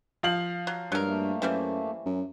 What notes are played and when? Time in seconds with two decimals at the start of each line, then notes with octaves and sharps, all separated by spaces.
0.23 F3 F5 F#7
0.67 F#3
0.92 G2 F#3 G#3 A#4
1.05 A3 A#3
1.42 F#2 E3 G3 C4
2.06 F#2